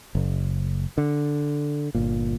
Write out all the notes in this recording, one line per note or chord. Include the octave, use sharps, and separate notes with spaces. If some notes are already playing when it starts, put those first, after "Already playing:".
F#1
D3
G1 A#2